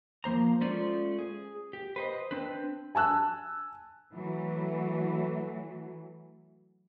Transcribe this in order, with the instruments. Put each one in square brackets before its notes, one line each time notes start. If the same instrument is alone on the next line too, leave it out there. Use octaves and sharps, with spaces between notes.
[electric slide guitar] F3 A#3 C5 A#5
G#3 A3 C#4 F4 C5 D5
G#4
G4
B4 C5 D#5
C4 D4 B4
[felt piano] G#5 A5 E6 F#6
[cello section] E3 F#3 A3